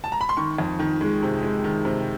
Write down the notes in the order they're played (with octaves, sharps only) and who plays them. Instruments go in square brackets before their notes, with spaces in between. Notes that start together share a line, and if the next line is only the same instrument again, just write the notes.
[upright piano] A5
A#5
B5
C6
D#3 C#6
F2
D#3
G#3
C3
G#3
D#3
C3